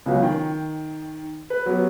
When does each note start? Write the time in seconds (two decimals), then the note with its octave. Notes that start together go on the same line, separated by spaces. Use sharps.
0.06 C#2 C#3 F#3 B3
0.23 D#3 G5
1.50 B4
1.66 F#3 B3 C#4 G4